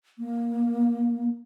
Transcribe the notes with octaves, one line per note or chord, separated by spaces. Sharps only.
A#3